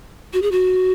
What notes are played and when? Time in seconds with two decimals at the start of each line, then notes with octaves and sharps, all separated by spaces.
0.33 F#4
0.42 G#4
0.52 F#4